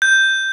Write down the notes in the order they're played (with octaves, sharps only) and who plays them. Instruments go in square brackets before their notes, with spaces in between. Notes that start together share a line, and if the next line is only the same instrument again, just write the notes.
[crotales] G6